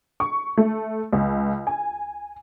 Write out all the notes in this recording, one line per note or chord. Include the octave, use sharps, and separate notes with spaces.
C#6
A3
C#2
G#5